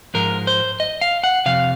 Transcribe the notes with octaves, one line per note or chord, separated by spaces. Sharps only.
G#2 F3 G#3 A#4
C5
D#5
F5
F#5
F2 C3 F5